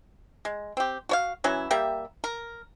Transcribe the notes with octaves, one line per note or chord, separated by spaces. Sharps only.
G#3
C4 G4
F#4 C#5 F5
E3 F#3 C#4 E4
G3 A#3 G4 E5
A#4